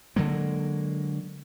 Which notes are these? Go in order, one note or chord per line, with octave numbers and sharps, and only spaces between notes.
D3 F#3 G#3 A#3